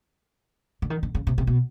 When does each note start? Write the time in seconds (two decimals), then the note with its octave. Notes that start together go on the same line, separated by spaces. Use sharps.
0.82 D3
0.90 D#3
1.03 D3
1.15 C#3
1.27 C3
1.38 C3
1.47 B2